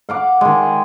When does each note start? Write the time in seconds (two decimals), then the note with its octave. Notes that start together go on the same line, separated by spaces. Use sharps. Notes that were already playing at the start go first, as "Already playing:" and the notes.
0.09 F5 F#5 D6
0.41 D#3 G#3